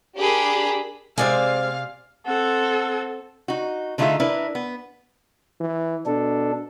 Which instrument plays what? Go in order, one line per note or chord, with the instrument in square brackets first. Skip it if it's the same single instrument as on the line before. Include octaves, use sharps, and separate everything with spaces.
[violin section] D4 G4 G#4 A#4 B5
[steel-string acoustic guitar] C3 D5 G#5 [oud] G#3 C4 [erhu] F5
[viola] C4 A4 [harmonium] F#5
[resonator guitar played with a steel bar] D#4 F#4
D3 A3 D#4 F4 G#4 E5
D4 E4 A#4 B4
B3
[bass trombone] E3
[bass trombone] B2 [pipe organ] D4 A4